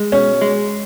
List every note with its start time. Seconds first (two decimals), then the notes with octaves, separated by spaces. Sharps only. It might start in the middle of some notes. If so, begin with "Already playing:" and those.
Already playing: G#3
0.12 B2 C#4
0.41 G#3